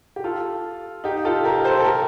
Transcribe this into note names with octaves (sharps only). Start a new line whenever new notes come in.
G4
F4 A4
D#4 G4
F4 A4
G4 A#4
A4 C5
A4
G4 A#4